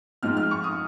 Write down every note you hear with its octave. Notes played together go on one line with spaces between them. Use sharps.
G#2 F3 C4 D#4 F6
F6
C#6
D#6